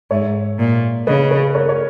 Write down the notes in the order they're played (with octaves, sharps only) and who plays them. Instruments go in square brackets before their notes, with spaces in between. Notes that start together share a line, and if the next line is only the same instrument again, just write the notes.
[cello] G#2 [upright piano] C#5 E5
[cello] A#2
[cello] C#3 [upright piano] B4 D#5
[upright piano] B4 D#5
A#4 C#5
C#5